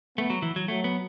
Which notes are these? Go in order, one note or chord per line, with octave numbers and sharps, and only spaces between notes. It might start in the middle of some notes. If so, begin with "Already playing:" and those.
A3 B3
F#3
E3
F#3
F#3 A3
B3